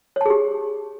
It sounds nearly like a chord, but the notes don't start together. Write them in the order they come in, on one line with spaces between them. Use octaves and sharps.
C#5 A5 G#4 G4